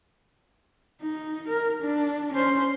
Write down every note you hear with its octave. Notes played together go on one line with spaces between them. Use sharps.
D#4
A#4
D4
C#4 C5